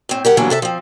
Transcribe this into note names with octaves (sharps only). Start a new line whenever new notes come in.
A2 C4
G4 A#4 F#5
D3 E3 F#3 G3 A#3 B3
C3 A4 E5
F3 C4